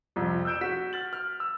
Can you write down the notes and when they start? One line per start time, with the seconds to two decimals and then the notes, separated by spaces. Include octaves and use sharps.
0.16 C2 F2
0.45 E6 F#6 G6 D7 E7
0.61 F#4 B6 E7
0.93 F6 A6 F#7
1.13 F6
1.40 E6